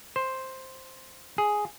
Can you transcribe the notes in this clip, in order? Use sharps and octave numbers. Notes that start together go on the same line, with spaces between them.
C5
G#4